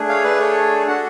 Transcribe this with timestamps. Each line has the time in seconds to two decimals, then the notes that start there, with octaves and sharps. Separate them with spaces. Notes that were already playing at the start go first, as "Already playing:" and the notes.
Already playing: A3 D4 G#4
0.09 C#5 F5
0.24 B4 D5
0.40 A4 C#5
0.87 D4 F#4 A4 F#5 A5